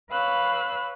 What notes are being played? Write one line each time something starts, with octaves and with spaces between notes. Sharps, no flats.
B4 C#5 F5 B5 E6 F#6